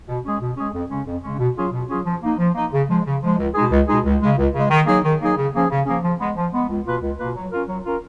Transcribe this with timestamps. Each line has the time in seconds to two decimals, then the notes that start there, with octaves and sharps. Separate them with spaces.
0.08 B2
0.24 G#3 C#4 G#4
0.41 B2
0.57 G#3 C#4 G#4
0.74 F2
0.90 C#3 G#3 C#4
1.06 F2
1.23 C#3 G#3 C#4
1.39 B2
1.56 F#3 C#4 F4 G#4
1.73 B2
1.89 F#3 C#4 F4 G#4
2.05 F3
2.22 A#3 D#4
2.38 F3
2.55 A#3 D#4
2.73 C#3
2.88 F3 G#3
3.06 C#3
3.22 F3 G#3
3.38 C#2
3.55 B2 G#3 D#4 G#4
3.71 C#2
3.88 B2 G#3 D#4 G#4
4.05 C#2
4.21 C#3 G#3
4.38 C#2
4.54 C#3 G#3
4.70 D#3
4.86 F#3 A#3 D#4 G#4
5.03 D#3
5.21 F#3 A#3 D#4 G#4
5.37 C#3
5.54 F3 A#3 C#4 G#4
5.70 C#3
5.86 F3 A#3 C#4 G#4
6.03 F3
6.20 G#3 B3
6.36 F3
6.52 G#3 B3
6.69 C#2
6.86 B2 A#3 F4 B4
7.02 C#2
7.19 B2 A#3 F4 B4
7.35 F#3
7.51 C#4 F4 A#4
7.68 F#3
7.84 C#4 F4 A#4